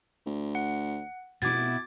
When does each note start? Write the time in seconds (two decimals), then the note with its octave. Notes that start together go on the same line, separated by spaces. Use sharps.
0.26 D2
0.55 F#5
1.42 F1 B2 E4 D6 G#6 A6